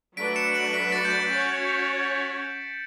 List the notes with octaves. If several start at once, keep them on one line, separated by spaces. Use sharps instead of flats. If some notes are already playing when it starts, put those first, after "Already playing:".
F#3 A3 D4 F#4 B4 B6 D7
C#7 E7
D7 F#7
B6 D7
B6
A6 C#7
G6
A6
C#4 F#4 C#5 A6